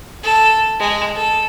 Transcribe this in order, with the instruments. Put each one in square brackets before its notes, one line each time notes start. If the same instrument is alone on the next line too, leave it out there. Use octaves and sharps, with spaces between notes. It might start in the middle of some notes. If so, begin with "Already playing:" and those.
[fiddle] A4
G#3
A4